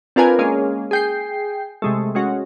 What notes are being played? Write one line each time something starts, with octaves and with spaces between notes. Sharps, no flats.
C4 D4 F4 A#4 B4 G#5
G#3 A#3 C#4 G#4 F5
G#4 G5 C7
C3 G#3 A3
G#3 C#4 F#4